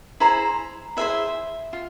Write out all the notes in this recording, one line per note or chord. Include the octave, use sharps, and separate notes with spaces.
E4 G#4 C5 A#5
E4 G#4 C5 E5
F4